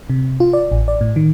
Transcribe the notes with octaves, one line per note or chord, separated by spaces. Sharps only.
C3
F4
D5
A1
D5
A2
D#3